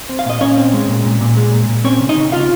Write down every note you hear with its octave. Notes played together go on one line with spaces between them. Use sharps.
C4
F5
A#2 D#5
A#2 C#4 C#5
C4
G#3
A#2
A#2
A#2
G#3
A#2
A#2
C4 C#4 C#5
C#3
D#4 D#5
C#3
C#3 F4 F5